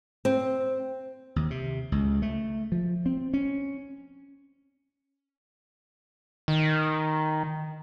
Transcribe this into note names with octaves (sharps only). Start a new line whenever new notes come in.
C4
D#2
C3
C#2
A3
F3
C4
C#4
D#3